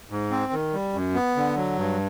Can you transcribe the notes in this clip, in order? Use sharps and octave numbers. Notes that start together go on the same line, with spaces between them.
G#2
C4
D#3
G3
F#2
B3
D3
F#3
G2